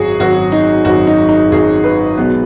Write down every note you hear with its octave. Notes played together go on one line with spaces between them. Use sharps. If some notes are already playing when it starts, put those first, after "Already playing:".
Already playing: G#1 F#2 F#3 F#4 G#4
G#1 F#2 F#3 F#4
D#4
G#1 F#2 F#3 F#4
D#4
D#4
G#1 F#2 F#3 G#4
B4
B1 B2 G#3 B3